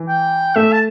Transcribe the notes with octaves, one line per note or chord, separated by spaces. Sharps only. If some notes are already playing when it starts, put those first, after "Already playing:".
Already playing: E3
G5
A3 E5
A5